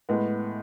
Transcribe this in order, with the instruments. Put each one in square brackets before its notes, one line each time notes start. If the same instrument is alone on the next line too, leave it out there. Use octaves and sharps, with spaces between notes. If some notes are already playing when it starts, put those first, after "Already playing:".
[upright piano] A2 G#3 B3